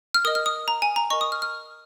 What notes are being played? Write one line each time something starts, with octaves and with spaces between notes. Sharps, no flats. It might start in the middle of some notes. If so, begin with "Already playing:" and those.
F6
A#4 D#5 D#6
F6
D#6
A#5
G#5
A#5
A#4 D#5 C#6
D#6
F6
F6